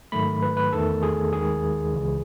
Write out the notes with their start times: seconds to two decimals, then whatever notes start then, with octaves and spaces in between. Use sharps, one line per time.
0.12 G#2 D#3 F#3 A3 B5
0.42 B4
0.57 B4
0.73 E2 D#3 A3 A4
1.03 G#4
1.33 D#2 D#3 G#3 G#4
1.93 C#2 C#3 E3 G#3